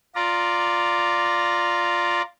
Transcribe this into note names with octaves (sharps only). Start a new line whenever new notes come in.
F4 D5 A#5